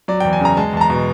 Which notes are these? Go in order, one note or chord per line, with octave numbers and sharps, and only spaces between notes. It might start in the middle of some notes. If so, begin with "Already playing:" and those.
F#3 D5
E2 G5
G#5
C#3 A#5
G#3 A5
E2 A5
A#5
B2